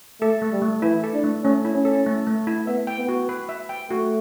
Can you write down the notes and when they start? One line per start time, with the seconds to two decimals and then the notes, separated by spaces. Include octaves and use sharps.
0.21 A3 A4
0.42 A3
0.52 G3
0.62 A3
0.82 E3 E4
1.04 A4
1.14 D4
1.24 A3
1.44 A3 C#4
1.65 E4
1.75 C#4
1.85 A4
2.06 A3
2.27 A3
2.47 E4
2.67 B3 E5
2.87 G5
2.98 B3
3.09 F#4
3.29 B4
3.49 E5
3.69 G5
3.91 A3 F#4